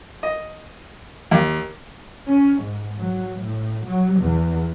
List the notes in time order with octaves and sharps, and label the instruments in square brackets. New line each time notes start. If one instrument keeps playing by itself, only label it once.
[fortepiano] D#5
D#2
[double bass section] C#4
G#2
F#3
A2
F#3
E2